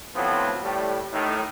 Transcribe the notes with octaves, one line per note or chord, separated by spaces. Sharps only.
D2 A2 F3 F#3 B3 C4
A2 G3
A2 D#3